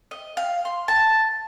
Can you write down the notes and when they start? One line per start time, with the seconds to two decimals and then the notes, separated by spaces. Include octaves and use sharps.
0.11 D#5
0.37 F5
0.65 C6
0.88 A5